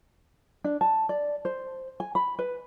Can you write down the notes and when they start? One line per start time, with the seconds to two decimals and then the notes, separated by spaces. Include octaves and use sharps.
0.64 D4
0.81 A5
1.09 D5
1.45 C5
2.00 G#5
2.15 B5
2.39 B4